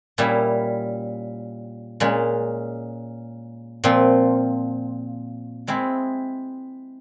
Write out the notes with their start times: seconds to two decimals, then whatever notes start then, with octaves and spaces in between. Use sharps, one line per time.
0.18 A#2 G3 C#4 E4
2.00 A#2 G#3 C#4
3.84 A#2 F3 C4
5.67 G#3 C4 E4 G#4